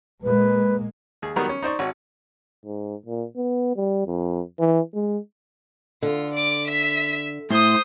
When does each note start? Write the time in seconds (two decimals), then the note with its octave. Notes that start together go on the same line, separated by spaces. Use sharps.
0.24 A#2 G#3 A#3 B4
1.22 D#2 G#4
1.36 D#3 F#3 G3 B3 A#4
1.49 C#4
1.63 D#4 C5 D5 C#6
1.79 G#1 F#4 C#5
2.66 G#2
3.06 A#2
3.37 B3
3.76 G3
4.06 F2
4.59 E3
4.94 G#3
6.02 D3 F4
6.34 D5 D6
6.67 E5 B6
7.51 A2 C5 C6 D#6